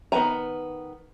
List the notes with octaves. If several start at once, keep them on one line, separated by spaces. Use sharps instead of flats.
D#3 B3 B4 G#5 A#5